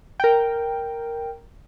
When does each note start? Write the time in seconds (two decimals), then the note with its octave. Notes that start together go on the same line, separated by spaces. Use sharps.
0.20 A#4 G5